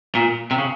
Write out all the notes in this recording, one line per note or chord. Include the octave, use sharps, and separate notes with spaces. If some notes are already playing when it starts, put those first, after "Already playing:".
A#2
C3
C#3